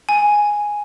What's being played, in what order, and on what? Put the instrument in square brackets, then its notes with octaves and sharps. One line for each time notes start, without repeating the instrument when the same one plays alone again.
[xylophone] G#5